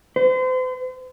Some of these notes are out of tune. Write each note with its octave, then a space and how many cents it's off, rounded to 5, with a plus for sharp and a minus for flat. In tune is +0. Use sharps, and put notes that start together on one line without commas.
C5 -40